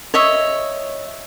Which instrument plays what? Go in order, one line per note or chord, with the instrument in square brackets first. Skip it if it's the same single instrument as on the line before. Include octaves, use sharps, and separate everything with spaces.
[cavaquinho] C#5 D#5 E5